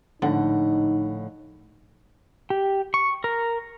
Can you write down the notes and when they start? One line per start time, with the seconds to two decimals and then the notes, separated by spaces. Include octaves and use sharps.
0.22 A#1 A2 D3 D#4 F#5
2.50 G4
2.94 C#6
3.24 A#4